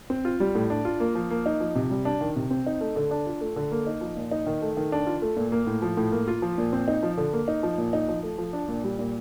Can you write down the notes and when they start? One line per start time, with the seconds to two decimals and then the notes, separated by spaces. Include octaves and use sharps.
0.10 C4
0.25 F4
0.40 G3
0.55 A2
0.70 D4
0.85 F4
1.00 A#3
1.15 F3
1.31 A#3
1.46 D#4
1.60 F3
1.75 C3
1.91 G3
2.05 D4
2.21 D#3
2.36 C3
2.51 C4
2.66 D#4
2.81 A3
2.96 D3
3.11 D4
3.26 F4
3.41 A3
3.56 D3
3.72 A#3
3.87 D#4
4.01 F3
4.17 A#2
4.31 D#4
4.46 D#3
4.62 A3
4.77 D#3
4.92 D4
5.07 F4
5.22 A3
5.37 A#2
5.52 A#3
5.67 A2
5.82 F3
5.97 A2
6.12 A#3
6.28 F4
6.42 F3
6.58 A#2
6.73 C4
6.88 D#4
7.03 F3
7.17 D3
7.33 A#3
7.48 D#4
7.63 F3
7.78 A#2
7.93 D#4
8.09 F3
8.23 A3
8.38 F3
8.53 D4
8.68 A#2
8.84 G3
8.99 A#2